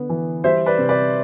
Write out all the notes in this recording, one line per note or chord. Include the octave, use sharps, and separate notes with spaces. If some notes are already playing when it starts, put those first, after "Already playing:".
Already playing: D3 B3
E3
G3 C5 E5
B4 D5
C3
B4 D5